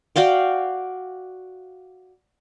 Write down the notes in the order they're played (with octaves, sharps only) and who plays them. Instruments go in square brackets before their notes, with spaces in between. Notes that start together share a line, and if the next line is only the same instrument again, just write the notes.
[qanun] F#4 D5 F5 G5